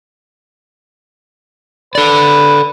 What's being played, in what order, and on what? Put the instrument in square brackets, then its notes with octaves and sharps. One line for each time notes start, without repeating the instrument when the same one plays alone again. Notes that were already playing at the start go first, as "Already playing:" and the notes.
[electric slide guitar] A4 D5 [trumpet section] B4